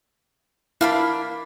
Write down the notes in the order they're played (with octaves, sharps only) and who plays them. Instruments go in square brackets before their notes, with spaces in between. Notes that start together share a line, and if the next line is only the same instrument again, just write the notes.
[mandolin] A#3 D4 B5 [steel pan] E4 F5